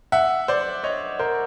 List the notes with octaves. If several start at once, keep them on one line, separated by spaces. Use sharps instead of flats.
E5 F#5
C5 D5
C#5 D#5
A#4 C5